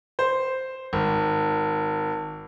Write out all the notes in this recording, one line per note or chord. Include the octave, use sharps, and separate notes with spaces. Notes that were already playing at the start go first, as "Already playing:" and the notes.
C5
G#1